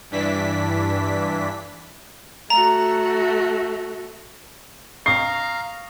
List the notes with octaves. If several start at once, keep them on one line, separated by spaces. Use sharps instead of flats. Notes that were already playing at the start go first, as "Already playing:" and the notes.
G2 E3 D4 B6
A3 F#4 A#5
F5 A#5 C#6 D#6 C7